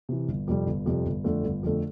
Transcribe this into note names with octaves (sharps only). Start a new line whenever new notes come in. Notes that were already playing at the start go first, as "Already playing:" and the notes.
C3 E3
G1
F2 C3 G3
G1
F2 C3 G3
G1
F2 D3 A3
G1
F2 D3 A3